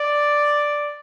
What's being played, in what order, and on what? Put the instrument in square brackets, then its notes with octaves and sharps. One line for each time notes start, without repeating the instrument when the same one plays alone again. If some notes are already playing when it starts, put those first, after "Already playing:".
Already playing: [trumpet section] D5